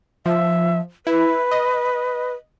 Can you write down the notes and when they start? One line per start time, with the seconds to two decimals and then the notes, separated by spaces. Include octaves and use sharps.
0.26 F3 E5
1.07 E4 B4
1.51 D#5